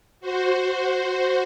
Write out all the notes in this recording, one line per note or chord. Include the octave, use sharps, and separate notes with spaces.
F#4 C5